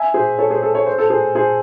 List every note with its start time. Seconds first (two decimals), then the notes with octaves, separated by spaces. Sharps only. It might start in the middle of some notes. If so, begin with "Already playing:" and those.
Already playing: E5 G#5
0.14 G#4 C5
0.38 A4 C#5
0.50 G#4 C5
0.62 A4
0.75 C#5
0.86 C5
0.98 A4
1.10 G#4 C5
1.35 G#4 C5